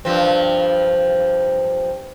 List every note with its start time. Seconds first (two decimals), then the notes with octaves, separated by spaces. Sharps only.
0.05 G2 F3 C4